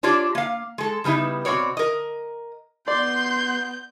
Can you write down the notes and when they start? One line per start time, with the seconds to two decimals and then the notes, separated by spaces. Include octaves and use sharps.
0.03 D4 F4 G4 C#5 D5
0.35 A#3 F5
0.78 G#3 A4
1.04 C#3 G3 B3 D#4 E4
1.45 B2 C4 F#4 C#5 D5
1.77 A#4 D#5
2.88 B3 D5 C6 G6